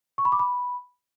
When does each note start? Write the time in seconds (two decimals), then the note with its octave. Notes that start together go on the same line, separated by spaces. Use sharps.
0.18 C#6
0.25 B5
0.32 D6
0.39 B5